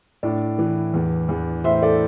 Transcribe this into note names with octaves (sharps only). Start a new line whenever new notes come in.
A2 D4
E3
E2
E2
A2 C5 E5
A4 D5